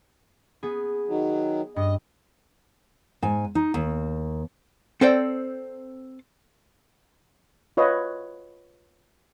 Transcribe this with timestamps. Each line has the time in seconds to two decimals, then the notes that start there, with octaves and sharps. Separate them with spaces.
0.63 B3 G#4
1.08 D#3 F#3
1.76 G2 D#5
3.22 G#2 G#5
3.55 D#4
3.74 D#2
5.01 C4 A4 C5 D5 G5
7.77 F4 B4 C#5 D#5